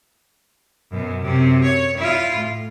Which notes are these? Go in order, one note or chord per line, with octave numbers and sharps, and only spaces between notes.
F#2 B2
F#2 C3
C#5
E4 F4
A2